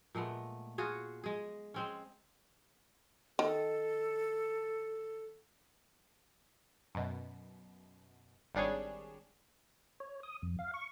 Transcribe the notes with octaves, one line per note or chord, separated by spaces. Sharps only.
A#2 G#3 A3 B3
F4 F#4 G#4 C#5
G#3 G#4
G#3 C4 C#4
D#3 A4
F#2 B2
G#1 G3 D4 G#4 C#5
C#5
D#6
F2
F5
C#6